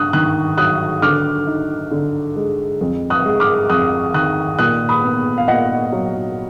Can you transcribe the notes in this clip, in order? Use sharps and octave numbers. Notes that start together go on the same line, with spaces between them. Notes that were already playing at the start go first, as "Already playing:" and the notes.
Already playing: D4 D#6 F#6
D#3 D#6 F#6
F#3 D#6 F#6
D3 D6 F6
D#4
D3
G#3
F2
D#6 F#6
G#3
D6 F6
F2 D#6 F#6
D#3 D#6 F#6
A#2 D#6 F#6
B5 D#6
B3
F5
A#2 D#5 F#5
F#3